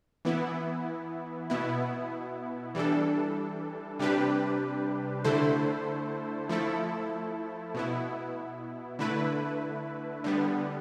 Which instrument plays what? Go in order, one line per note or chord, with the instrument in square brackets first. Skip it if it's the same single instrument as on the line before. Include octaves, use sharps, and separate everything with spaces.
[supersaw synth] E3 B3 E4
B2 B3 E4
E3 G3 D4 A4
C3 G3 D4 G4 B4
D3 A3 E4 A4 C5
F3 A3 E4 A4
B2 B3 E4
D3 A3 E4 B4
D3 G3 B3